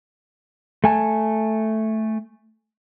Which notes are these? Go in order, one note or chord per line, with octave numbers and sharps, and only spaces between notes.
A3 G#5 A5